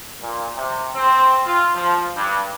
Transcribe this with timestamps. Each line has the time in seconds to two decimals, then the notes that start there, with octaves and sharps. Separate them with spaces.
0.22 A#2
0.55 C3
0.94 C4
1.46 F4
1.76 F3
2.15 G2